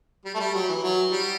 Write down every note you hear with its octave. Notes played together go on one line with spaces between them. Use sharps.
G3
A3
G3
F#3
E3
F#3
G3